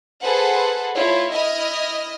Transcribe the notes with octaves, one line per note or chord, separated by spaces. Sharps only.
G#4 A4 B4 C5 F#5
A3 E4 F4 C#5
E4 D#5 E5 D#6 F6